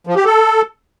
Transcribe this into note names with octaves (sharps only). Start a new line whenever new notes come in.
F3
G4
A4